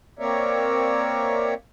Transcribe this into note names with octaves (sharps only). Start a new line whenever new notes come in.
A#3 C4 A#4 C#5 D5 E5